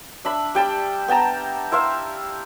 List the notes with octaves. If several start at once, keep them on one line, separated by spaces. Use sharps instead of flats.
D4 E5 B5
G3 G5 A5 B5
B3 G5 A5 A#5
E4 C5 E5 F5